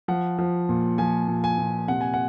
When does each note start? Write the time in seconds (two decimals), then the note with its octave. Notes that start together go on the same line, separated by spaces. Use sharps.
0.08 F3 F#5
0.38 F3
0.69 A#2
0.98 F3 G#5
1.28 A#2
1.44 G#5
1.58 A#2
1.88 C3 F#5
2.01 G#5
2.14 F#5